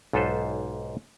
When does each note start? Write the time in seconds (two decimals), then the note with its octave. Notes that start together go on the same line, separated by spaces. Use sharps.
0.13 B1 G#2 F4 A4 B4 C5